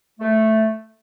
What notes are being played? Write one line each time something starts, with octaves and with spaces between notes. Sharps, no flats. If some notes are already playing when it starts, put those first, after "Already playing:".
A3